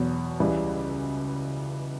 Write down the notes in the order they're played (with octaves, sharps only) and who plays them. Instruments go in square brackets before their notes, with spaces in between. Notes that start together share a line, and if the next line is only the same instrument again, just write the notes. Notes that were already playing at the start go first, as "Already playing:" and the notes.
Already playing: [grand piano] E2 B2 F#3 B3
C#2 C#3 E3 G3